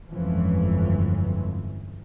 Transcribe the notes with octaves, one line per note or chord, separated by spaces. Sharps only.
G1 F2 G#2 E3 F3 C#4